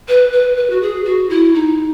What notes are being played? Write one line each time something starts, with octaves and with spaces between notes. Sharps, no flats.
B4
B4
B4
F#4
G#4
F#4
E4
D#4